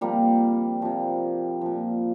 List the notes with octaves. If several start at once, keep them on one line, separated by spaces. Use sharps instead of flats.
C3 F3 G3 A#3
C3 F3
A#2 F3